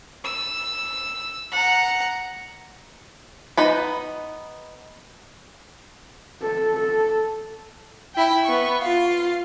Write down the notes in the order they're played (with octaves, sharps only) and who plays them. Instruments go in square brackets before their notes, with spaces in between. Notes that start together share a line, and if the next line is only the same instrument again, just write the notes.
[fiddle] E6
F#5 A#5
[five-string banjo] B3 D#4 B4 B5
[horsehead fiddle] A4
A4
[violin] E4 G5
B3 C#6
F4 F5